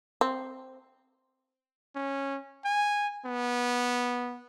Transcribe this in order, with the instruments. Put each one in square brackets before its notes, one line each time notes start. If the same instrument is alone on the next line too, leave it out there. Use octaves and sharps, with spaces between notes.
[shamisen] C4
[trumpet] C#4
G#5
B3